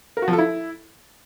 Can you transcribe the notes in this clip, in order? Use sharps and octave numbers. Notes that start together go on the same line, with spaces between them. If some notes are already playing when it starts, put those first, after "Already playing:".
A#4
F#4
F3
A4
E4